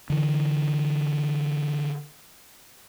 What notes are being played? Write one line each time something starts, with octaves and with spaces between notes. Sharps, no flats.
D3 E3